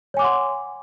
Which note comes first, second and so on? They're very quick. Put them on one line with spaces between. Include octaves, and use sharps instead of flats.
C#5 G#5 D6 F#5 C6